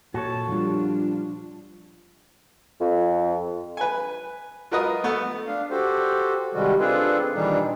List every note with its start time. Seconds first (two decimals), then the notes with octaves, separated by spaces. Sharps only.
0.14 A#2 F#4 A4 C#5 A5
0.48 F3 G3 D4 F4
2.81 F2
3.77 B4 G#5
4.71 F4 F#4 A#4 B4 D#5 D#6
5.04 A3 B3
5.47 D4 F5
5.70 F#4 G4 A4 C5
6.54 C3 D#3 G3 G#3 F#4
6.80 C4 D4 F4 G#4 A4 B4
7.34 A#2 D#3 E3 G3 D4 D#4